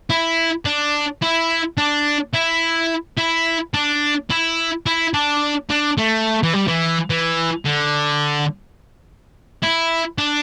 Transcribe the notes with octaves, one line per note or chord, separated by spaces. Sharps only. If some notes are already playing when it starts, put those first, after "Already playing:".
E4
D4
E4
D4
E4
E4
D4
E4
E4
D4
D4
A3
E3
G3
E3
E3
D3
E4
D4